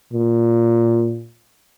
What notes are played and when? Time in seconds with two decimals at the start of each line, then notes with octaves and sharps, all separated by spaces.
0.13 A#2